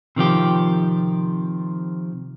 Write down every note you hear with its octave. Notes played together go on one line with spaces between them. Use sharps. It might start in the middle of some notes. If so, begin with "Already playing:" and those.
C3 D#3 F3 G4